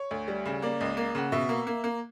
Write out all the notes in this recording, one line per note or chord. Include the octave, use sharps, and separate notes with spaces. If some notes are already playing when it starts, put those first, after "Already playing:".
Already playing: C#5
D2
G3
C#3
A#3 D5
C#2
A#3
C#3 F#5
B2 E5
A#3
A#3
A#3